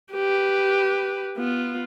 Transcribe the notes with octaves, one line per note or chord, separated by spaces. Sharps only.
G4 B4
B3 F4